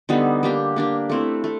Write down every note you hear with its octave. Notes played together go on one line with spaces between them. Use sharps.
D3 G3 B3 D#4
A#3 D4 G4
A#3 D4 G4
A3 C4 E4
A3